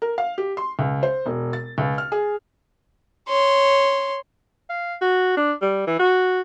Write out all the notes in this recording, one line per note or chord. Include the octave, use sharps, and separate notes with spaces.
A#4
F5
G4
C6
C#2
C5
E1
A6
C#2
F6
G#4
C#5 C6
F5
F#4
D4
G3
E3
F#4